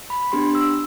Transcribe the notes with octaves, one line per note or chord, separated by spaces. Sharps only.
B5
B3 D4 G4 C6
E6